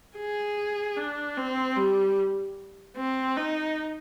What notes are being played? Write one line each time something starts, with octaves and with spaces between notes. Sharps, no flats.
G#4
D4
C4
G3
C4
D#4